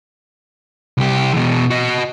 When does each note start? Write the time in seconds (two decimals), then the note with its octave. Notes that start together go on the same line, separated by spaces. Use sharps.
0.97 C2 G4
1.33 E2 B2
1.71 F#4 D#5